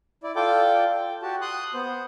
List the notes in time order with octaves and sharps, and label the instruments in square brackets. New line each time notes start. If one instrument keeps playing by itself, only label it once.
[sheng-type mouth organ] E4 D5
F4 A4 D5 G5 D6
G5
F#4 G4 A5
C6 D#6 F#6
B3 C5